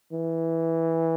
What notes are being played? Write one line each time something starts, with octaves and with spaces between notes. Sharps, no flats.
E3